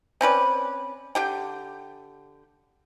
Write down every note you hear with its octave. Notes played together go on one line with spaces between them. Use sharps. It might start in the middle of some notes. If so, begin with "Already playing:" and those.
C4 C#4 B4 D5
D3 G4 G5